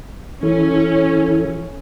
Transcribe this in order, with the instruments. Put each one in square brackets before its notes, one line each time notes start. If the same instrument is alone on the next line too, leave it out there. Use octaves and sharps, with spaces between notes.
[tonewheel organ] E3 E4 A4 [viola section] C#4